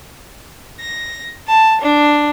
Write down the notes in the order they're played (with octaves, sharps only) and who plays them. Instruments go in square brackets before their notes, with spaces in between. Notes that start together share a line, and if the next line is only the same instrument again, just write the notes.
[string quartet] A#6
A5
D4